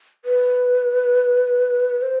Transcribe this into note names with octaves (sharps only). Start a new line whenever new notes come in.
B4
C5